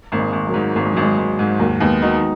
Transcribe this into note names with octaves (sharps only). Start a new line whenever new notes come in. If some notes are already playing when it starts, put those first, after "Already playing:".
G#1 A#3
G#3
G#1
F#3 A#3
G#2
G#1 A#3
G#3
G#1 F#3
G#3
G#1
G#2
D#2 F#3 A#3
D#2 G#3 B3
D#3 D#4 F#4